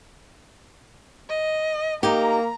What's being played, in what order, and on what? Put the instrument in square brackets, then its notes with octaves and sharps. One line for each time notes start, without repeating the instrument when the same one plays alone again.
[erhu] D#5
[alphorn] A#3 [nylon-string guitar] D#4 G4 [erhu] A#5